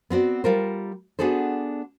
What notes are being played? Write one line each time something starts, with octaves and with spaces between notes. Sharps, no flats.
B3 C4 F#4 D5
G3 F4 A#4 C5
B3 D4 F#4 G#4 A4 C5